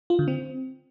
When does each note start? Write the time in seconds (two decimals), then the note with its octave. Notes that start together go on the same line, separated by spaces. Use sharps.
0.10 F4
0.19 D3
0.28 C4